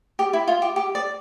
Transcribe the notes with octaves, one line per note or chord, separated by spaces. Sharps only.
G4
E4
F4
G4
G4
D5